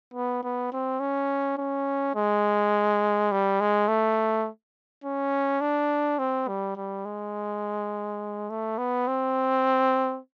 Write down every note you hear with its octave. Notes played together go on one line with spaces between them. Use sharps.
B3
B3
C4
C#4
C#4
G#3
G3
G#3
A3
C#4
D4
C4
G3
G3
G#3
A3
B3
C4